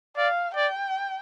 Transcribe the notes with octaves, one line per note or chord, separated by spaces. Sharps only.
D5 F5
D5 G5